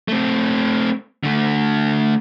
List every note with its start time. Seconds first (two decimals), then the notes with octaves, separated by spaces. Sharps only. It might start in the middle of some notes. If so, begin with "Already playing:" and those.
0.08 A3 C4
1.24 D3 A3